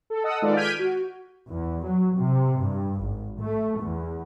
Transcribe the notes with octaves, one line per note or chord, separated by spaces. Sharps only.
A4
A4 D#5 F#5 D#6 E6
D#3 G#3 F4 A4 B4 D5
F6 G6 G#6 B6 D7 D#7
F#4
E2
F#3
C3
G2
G#1
A3
E2